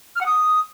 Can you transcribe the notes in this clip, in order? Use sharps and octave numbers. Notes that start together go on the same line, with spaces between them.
F6
F#5
D#6